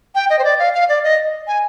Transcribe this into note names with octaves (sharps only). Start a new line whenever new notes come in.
G5
D#5
C5
D5
F5
F5
D5
D#5
G#5